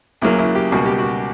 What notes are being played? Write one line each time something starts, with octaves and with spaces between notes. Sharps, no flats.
C#2 C#3 F#3 A#3 E4
E4
G4
C#2 B2 G3 A#3 F#4
G4
F#4